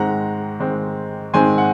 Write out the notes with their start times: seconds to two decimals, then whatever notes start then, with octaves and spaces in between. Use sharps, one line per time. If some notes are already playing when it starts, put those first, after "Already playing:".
Already playing: G#2 D#3 G#3 C4 F#5 A#5
0.60 G#2 D#3 G#3 C4
1.33 G#2 D#3 G#3 C4 G#5 C6
1.58 F#5